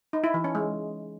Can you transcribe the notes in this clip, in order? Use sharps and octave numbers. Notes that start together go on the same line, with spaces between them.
D#4
E4
E3
C#4
G#3